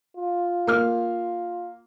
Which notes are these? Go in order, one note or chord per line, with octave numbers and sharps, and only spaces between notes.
F4
A#3 F6